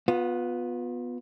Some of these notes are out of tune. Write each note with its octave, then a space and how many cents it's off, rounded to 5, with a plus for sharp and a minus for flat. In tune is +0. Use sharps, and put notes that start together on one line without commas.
B3 +0 F4 +30